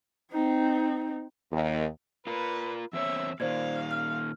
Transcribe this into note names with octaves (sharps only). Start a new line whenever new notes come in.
C4 D#4
D#2
F4 A#4 B4
E2 C4 C#5 E5
A#2 D#3 C5 D5 F5 G#6
F6